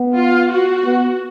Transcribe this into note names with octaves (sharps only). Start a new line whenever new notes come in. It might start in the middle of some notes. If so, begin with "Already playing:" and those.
Already playing: B3
F4
F#4
B3